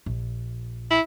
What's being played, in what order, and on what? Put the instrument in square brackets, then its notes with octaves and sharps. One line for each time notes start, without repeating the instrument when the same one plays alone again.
[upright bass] A#1
[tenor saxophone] E4